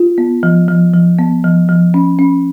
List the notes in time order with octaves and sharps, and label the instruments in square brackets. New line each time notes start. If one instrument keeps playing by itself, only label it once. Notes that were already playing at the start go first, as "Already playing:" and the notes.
Already playing: [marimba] F4
B3
F3
F3
F3
B3
F3
F3
C#4
C#4